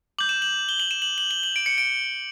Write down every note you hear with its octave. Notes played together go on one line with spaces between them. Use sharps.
D6 G6 F#7
E7
F#7
G7
F#7
E7
F#7
F#7
G7
F#7
D7
C#7
D7